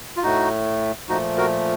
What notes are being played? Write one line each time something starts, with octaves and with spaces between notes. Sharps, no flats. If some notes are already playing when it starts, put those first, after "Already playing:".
F4
A2 A3 D#4 F#4
A#2 F3 A3 D#4 F#4
F#4 A#4